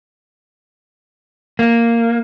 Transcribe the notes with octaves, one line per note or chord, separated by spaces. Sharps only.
A#3